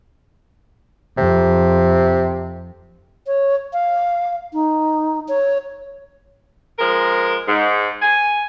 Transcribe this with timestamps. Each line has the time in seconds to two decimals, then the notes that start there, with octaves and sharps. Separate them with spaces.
1.17 F2 C3
3.26 C#5
3.73 F5
4.53 D#4
5.28 C#5
6.79 F3 G#3 A#4
7.47 G#2
8.02 G#5